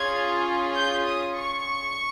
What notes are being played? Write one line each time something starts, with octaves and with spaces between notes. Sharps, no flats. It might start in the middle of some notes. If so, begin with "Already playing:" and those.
Already playing: C#4 F4 G#4 G#6
G6
D#6
C#6